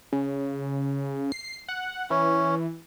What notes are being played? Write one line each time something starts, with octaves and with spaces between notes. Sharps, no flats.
C#3
C7
F#5
E3 C#4